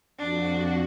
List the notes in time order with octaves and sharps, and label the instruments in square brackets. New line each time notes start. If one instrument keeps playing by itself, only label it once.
[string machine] F2 F#4 [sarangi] D4